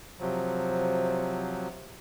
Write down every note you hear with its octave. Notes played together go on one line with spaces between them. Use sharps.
C3 F3 F#3